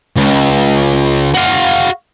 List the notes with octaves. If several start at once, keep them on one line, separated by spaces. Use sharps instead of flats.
C#2
F#4 F5